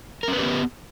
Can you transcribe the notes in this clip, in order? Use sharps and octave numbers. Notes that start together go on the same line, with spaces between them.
B3 C#4 G4 A#4 B4